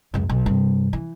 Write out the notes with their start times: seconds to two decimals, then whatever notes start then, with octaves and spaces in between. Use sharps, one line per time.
0.14 C#2 F#2
0.29 B1
0.46 G2 C3
0.93 E3